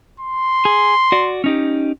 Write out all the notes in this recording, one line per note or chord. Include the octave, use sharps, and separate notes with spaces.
C6
G#4
F#4 D5
C#4 D#4 G4